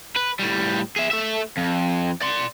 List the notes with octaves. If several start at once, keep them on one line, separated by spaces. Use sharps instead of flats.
B4
A2 G3
G#4 E5
A3 E5
F2
D5 C6